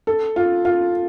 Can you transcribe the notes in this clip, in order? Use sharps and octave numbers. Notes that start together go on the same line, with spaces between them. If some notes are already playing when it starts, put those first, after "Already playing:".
A4
F4
F4